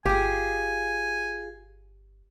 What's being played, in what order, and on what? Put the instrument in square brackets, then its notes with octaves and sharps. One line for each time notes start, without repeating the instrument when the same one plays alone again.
[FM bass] G1 [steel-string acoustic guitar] F4 G#4 [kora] G4 [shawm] G#5